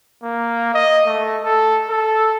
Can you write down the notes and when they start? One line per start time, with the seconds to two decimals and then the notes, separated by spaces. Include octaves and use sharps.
0.23 A#3
0.74 D#5
1.07 A3
1.44 A4
1.90 A4